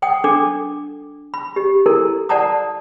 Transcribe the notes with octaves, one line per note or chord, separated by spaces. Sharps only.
F#5 G5 D#6
D4 A4 D6
B5
G4
E4 A4 A#4
D5 F#5 A5 A#5 D#6